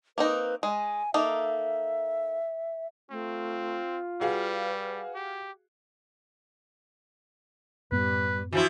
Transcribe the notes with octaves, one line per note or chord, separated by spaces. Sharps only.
A#3 C4 D#4 B4
G#3 G#5
A#3 D#4 A4 E5
A3 C4 F4
G3 F#4 G#4 B4 F5
G4
F#2 A2 G3 B3 B4
E3 F3 E4 F#4